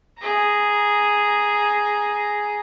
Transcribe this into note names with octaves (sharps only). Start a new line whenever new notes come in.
G#4 A#5